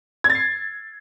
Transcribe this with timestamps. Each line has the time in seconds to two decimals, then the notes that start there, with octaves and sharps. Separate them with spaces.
0.24 G#6
0.30 A6
0.35 C7